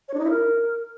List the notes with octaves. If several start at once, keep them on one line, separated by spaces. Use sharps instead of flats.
C#5
D4
D#4
E4
A#4